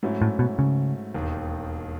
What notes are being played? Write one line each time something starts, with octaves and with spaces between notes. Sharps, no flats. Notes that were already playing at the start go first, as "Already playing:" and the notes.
G#2 F#3 A3 C#4 E4
A2
B2
C#3
E1 D#2 D#3